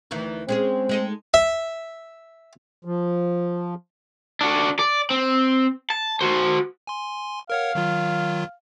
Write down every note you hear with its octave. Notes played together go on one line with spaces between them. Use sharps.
D2 D#3 E3
G#3 C4 C#4 G#4
G#3 D#4 A4
E5
F3
D4 F#4
D5
C4
A5
F#4 C5
G#5 C6
A#4 C#5 F5 F#5
D#3 F#3 F4